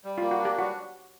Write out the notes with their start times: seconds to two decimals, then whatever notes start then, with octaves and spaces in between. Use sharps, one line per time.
0.04 G3
0.18 A#3 F4
0.31 F#4
0.40 D4
0.45 G4
0.59 G3 F#4